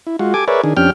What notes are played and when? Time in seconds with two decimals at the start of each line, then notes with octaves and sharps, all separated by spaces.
0.07 E4
0.19 G#3 F4 F#4
0.34 G4 A4 G#5 D6
0.48 G#4 A#4 B4 C#5 D5 E5
0.63 D#3 D4 G#4
0.77 F2 C#4 D4 G4 G5 F6